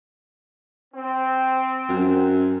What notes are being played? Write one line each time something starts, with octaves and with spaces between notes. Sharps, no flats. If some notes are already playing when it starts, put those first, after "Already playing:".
C4
F#2